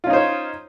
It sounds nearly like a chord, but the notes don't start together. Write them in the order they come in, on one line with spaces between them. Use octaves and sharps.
F4 C#4 D#4 C5 C#5